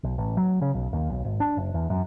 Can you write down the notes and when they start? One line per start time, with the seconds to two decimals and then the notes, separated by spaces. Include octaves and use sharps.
0.04 B1
0.18 A1
0.37 F#3
0.61 C#3
0.74 B1
0.93 D#2
1.10 B1
1.25 G#1
1.40 D4
1.57 F#1
1.74 E2
1.90 F#2